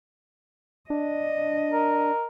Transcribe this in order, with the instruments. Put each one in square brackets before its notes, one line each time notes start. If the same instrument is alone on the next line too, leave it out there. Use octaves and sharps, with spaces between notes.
[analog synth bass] D4 [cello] D#5
[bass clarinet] A#4